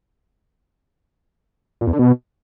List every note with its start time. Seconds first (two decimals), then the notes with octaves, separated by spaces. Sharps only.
1.81 A#2
1.87 E2
1.93 D3
1.99 B2